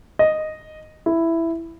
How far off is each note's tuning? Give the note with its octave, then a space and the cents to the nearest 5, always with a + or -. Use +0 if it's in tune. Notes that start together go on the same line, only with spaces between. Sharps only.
D#5 -5
E4 +5